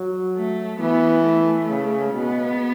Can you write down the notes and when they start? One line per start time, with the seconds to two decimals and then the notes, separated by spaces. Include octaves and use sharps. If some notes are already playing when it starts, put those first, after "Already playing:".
Already playing: F#3
0.37 A3
0.80 E3 B3
1.25 A3
1.69 C#3
2.13 B2 B3